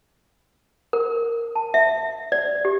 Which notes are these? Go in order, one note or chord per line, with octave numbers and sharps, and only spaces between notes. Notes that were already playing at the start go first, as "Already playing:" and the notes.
A#4
A5
E5
D5
G4